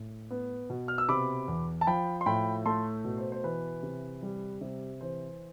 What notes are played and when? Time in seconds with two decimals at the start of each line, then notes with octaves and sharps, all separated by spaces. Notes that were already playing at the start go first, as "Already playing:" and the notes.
Already playing: A2
0.31 B3
0.70 B2
0.88 F6
0.98 E6
1.09 C3 B5 D6
1.48 E2
1.81 A5
1.87 F3 G5 B5
2.21 C6
2.26 A2 G5 B5
2.65 A3 A5 C6
3.04 B2
3.18 C5
3.32 C5
3.44 E3 B4
3.83 C3
4.23 G3
4.61 C3
5.01 E3 C5